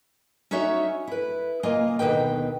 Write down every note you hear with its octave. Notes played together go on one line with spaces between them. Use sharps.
C#4 D#4 F#4 C#5 E5
E4 B4
C#3 A#3 F4 D#5 F5 G#5
D2 B2 D#3 B4 G5